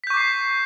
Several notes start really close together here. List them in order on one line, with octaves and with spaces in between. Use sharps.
B6 G6 C#6 D6 C7